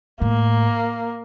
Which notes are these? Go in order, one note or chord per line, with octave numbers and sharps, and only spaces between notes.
A2 A#3